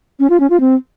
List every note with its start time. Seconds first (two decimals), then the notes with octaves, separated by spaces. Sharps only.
0.20 C#4
0.30 F4
0.40 C#4
0.50 F4
0.60 C4